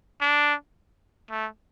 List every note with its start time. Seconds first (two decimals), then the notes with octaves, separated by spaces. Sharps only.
0.21 D4
1.31 A3